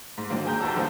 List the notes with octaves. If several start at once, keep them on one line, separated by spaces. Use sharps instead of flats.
G#2
D3 D#3 F3 F#3 A#3
G#4 G5 A#5 G6
G1 C2 F#4 A5 E6
D3 D#3 F3 G#3 A#3 F4